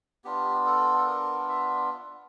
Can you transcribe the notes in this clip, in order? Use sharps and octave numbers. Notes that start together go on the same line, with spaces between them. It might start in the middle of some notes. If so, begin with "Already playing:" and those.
B3 D4 F4 G4
A4
A4
A#4
E5